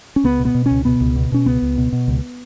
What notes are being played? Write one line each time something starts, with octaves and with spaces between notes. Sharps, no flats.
C#4
C#2 B3
B2
B3
B2
C#4
C#2
B2 B3
C#2
B2
B2 C#4
C#2 B3
C#2
B2
B2
C#2